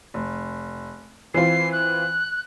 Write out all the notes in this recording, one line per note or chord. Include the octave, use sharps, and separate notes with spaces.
F1
E3 C4 F4 C7
F#6